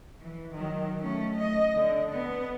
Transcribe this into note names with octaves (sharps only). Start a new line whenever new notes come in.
E3
D#3 F#3
A3 C#4
D#5
D3
B3